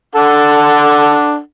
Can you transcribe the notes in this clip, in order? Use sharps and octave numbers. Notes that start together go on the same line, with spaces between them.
D4 A4 F#5